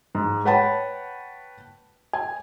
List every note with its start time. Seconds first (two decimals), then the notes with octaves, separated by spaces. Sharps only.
0.15 G#2
0.45 B4 C#5 F#5 G5 A5 B5
2.13 G#5